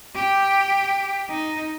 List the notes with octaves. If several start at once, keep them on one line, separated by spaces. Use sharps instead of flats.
G4
D#4